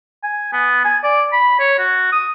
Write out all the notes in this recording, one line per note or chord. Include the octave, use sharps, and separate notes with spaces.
G#5
B3
G#5
D5
B5
C#5
F#4
D#6